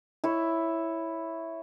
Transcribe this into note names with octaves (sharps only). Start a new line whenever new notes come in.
E4 C#5